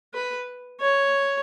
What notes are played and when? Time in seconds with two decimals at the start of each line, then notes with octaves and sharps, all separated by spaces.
0.14 B4
0.81 C#5